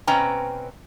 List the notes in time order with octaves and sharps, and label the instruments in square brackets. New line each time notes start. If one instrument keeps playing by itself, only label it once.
[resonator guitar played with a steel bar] B2 C4 C#4 B4 G5 A#5